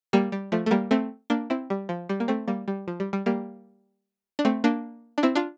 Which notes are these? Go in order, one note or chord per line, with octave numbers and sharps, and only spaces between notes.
G3 A#3
G3
F3 A3
A3
G3 A#3
A3 C4
A#3 D4
C4 E4
G3
F3
G3
A#3
A3 C4
G3 A#3
G3
F3
G3
G3
G3 A#3
D4
A3 C4
A#3 D4
D4
C4 E4
D4 F4